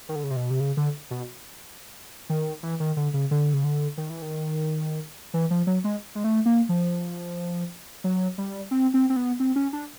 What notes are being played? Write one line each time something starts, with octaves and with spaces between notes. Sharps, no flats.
D#3
D3
C#3
C3
B2
C3
C#3
D3
B2
D#3
E3
D#3
D3
C#3
D3
C#3
D3
D#3
E3
D#3
E3
F3
F#3
G#3
G#3
A3
A#3
F3
F#3
G3
C4
C4
C4
B3
C4
C#4
D4